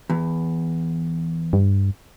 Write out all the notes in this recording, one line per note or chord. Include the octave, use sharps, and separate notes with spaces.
E2
G2